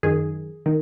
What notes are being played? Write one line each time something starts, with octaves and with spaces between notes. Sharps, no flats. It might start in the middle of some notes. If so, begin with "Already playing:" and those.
F#2 D#3 G#4
D#3